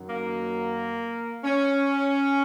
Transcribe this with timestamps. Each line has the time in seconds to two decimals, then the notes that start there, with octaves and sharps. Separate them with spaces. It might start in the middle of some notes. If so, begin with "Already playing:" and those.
Already playing: F#2 D#3 F#3
0.09 A#3
1.44 C#4